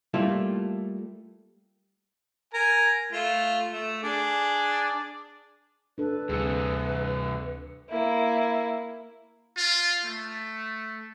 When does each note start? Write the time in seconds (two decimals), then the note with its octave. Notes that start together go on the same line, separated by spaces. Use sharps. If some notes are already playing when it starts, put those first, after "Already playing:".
0.14 G3 A3 A#3 E4 F4 A4
2.54 A#4 G#5 A#5
3.12 A3 F4
3.72 A3
4.03 D4 G#4 D5
5.98 D4 A4 B4
6.29 D2 G2 C3 G#4 E6 C#7
7.89 A#3 E4
9.57 F4
10.05 A3